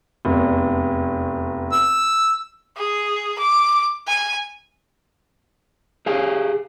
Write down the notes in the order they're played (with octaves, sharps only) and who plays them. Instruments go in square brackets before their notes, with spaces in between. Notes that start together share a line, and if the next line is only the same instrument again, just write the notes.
[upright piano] F1 E2
[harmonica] E6
[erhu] G#4
D6
G#5
[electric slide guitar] G4 G#4 F5 G#5